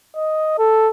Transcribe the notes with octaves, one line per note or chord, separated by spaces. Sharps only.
D#5
A4